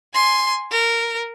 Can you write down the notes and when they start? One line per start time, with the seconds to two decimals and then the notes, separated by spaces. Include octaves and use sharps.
0.14 G#5 C6
0.71 A#4